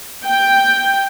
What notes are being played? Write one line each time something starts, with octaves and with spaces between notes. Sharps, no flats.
G5